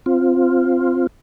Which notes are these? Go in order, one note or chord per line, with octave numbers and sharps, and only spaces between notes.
C4 F4